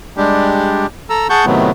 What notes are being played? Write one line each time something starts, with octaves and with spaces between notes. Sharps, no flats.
G3 G#3 D4 G4
A4 A#5 E6
G#4 F#5 A5 C#6 G6
A2 C3 D#3 F#3 A3 B3